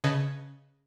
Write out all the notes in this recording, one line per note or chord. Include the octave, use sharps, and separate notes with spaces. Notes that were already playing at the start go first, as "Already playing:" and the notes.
C#3 B4 D#5 A5 G#6 B6